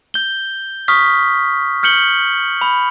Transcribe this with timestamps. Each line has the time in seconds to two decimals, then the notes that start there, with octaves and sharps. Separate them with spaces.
0.14 G6 G7
0.88 C#6 D#6 F6 B6
1.83 F6 G6 C#7 F#7 G7
2.61 B5